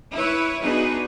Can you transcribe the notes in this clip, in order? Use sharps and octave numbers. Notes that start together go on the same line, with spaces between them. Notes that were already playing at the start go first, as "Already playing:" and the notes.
E4 B4 C#5
B3 D4 D#4 F#4 G#4 B4